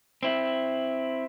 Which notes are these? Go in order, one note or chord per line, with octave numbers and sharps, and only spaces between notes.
C4 E4